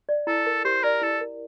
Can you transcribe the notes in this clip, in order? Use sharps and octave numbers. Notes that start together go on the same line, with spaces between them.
D5
E4 A4
A#4
G4 C5
A#4 D5
E4 A4
A#4